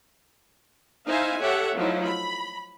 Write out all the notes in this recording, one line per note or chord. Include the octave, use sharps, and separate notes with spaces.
D#4 E4 C5 E5 F5 G#5
G4 A4 C#5 E5 F#5
F3 F#3 A3 D#4 E4
B5